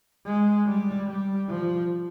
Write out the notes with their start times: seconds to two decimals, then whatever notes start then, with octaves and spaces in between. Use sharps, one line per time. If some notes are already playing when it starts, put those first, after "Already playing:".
0.25 G#3
0.66 G3
1.07 G3
1.50 F3